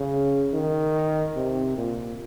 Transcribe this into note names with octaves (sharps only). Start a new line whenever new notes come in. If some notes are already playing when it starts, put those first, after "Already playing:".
Already playing: C#3
D#3
C3
A#2